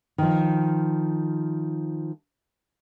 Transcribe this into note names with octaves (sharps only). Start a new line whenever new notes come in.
D#3 F3